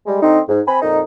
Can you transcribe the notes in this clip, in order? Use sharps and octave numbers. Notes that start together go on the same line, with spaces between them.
G3 G#3
D3 C4 D#4
G#2
C4 G#5 B5
F2 A#2 D#4